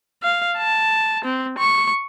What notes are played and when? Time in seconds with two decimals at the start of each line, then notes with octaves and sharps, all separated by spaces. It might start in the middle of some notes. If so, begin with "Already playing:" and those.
0.23 F5
0.58 A5
1.25 C4
1.58 C#6